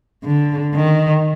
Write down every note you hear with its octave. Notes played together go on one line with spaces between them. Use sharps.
D3
D#3